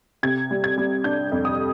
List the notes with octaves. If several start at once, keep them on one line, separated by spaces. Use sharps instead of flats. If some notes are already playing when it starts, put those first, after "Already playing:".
C3 G#6
G3
G#6
G3
D4 G6
F2
D#6